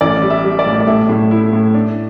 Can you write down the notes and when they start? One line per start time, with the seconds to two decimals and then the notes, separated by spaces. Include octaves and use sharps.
0.01 A1 D5
0.22 G3
0.30 E5
0.44 G3
0.59 D5
0.66 A2
0.80 D5
0.87 A2 E5
1.09 A2
1.31 E4
1.53 A2
1.74 D4